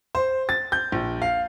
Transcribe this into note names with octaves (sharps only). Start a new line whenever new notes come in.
C5
A6
G6
A#1
F5